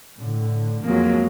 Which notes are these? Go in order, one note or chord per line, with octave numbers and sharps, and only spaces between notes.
A2 D3
F2 F#3 G#3 A#3